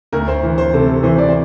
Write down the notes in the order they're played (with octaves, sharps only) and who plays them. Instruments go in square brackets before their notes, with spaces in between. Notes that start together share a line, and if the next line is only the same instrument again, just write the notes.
[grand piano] D2 [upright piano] A#4
[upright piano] C5
[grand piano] E3
[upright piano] C5
[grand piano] C3 [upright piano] A4
[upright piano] A4
[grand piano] E3 [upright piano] C5
[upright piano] D5
C5